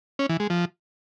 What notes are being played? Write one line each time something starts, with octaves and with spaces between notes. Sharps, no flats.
C#4
E3
G#3
F3